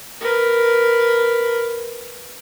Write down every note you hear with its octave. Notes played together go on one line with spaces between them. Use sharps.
A#4 B4